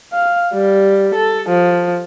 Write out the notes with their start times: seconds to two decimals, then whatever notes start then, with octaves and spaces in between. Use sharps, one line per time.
0.13 F5
0.53 G3
1.15 A4
1.49 F3